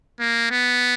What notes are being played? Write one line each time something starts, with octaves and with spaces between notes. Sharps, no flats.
A#3
B3